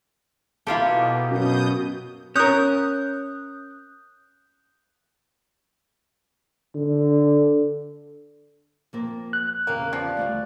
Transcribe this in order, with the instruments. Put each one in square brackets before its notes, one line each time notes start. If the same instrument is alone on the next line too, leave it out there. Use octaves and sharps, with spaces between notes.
[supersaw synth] B2 [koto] A#3 F4 G4 [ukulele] E4 A4
[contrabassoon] F#2 [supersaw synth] B2 D#6 G6
[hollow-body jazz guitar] C#4 A#4 [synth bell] D#6 F#6 G6
[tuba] D3
[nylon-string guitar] F2 A#3 A#4
[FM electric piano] F#6
[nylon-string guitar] E2 C#3 G4 [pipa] A#3
[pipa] F3 F4 D5
[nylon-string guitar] D2 G3 A3